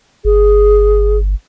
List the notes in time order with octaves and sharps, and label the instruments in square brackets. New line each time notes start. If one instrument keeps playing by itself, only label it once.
[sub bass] G1 [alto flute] G#4